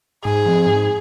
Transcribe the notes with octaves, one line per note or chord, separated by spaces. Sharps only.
G#2 G#4
F3 C4
G#2